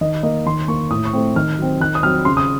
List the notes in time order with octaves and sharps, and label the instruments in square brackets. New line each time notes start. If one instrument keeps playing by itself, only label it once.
[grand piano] D#3 D#5
A#3 D#5
D#3 C6
A#3 C#6
A2 D#6
C#6
A3 C4
D#3 F6
F#3 C4
D#3 F#6
D#6
F#3 C4 F6
C#3 C6
D#6